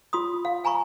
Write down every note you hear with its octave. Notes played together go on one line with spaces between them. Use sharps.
F4 C6 D#6
F5
F5 G#5 A#5 B5 C#6